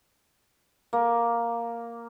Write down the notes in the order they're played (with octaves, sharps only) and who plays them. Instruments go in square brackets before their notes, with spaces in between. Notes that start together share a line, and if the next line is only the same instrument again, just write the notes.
[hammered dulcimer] A#3